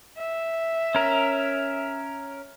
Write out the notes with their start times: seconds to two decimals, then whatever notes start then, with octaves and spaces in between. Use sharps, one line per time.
0.18 E5
0.95 C#4 A#4